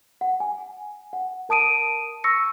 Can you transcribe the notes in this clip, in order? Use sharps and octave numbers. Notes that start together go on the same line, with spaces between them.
F#5
G#5
F#5
A#4 A5 D#6 D7 D#7
C#6 E6 A#6 C#7